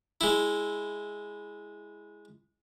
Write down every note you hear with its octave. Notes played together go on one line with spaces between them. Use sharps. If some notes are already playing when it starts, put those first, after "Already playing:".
G#3 E4